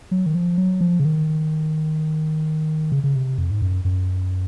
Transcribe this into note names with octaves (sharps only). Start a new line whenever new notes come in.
F#3
D#3
F3
F#3
F3
C#3
D#3
C#3
C#3
C3
F2
G#2
F#2
F#2